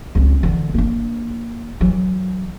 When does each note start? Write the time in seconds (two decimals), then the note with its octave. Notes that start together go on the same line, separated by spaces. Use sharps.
0.15 C#2 C4
0.43 D3 E3
0.74 A#3 D4
1.81 E3 F#3